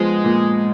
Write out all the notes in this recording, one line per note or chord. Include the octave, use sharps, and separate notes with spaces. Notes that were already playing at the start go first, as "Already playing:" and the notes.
Already playing: F3 G#3 B3
A#2